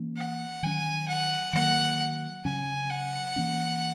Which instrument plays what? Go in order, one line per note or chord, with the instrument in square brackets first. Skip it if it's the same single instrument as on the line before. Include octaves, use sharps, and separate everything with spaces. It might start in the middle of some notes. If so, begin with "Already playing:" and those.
Already playing: [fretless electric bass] E3 A#3 C#4
[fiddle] F#5
[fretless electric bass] D#3 F#3 C#4 [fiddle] G#5
[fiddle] F#5
[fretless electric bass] D#3 F#3 A#3 [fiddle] F#5
[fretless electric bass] C#3 F#3 C#4 [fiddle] G#5
[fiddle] F#5
[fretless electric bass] E3 A#3 C#4